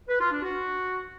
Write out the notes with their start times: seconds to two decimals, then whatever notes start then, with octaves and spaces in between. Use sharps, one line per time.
0.08 B4
0.19 F4
0.31 D4
0.43 F#4